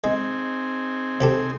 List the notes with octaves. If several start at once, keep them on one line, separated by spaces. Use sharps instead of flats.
G#3 C4 D#4 G#4
C3 G4 A4